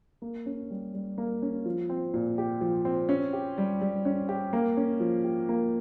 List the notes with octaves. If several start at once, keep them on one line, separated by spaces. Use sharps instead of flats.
A#3
C#4
G3
G3
A#3
C#4
F3
C4
A#2
G4
F3
C4
C#4
G4
G3
G3
C#4
G4
A#3
C#4
F3
G4
A#3